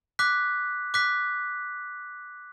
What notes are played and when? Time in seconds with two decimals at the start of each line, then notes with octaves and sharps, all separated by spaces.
0.19 D6 F#6 B6
0.94 D6 F#6 B6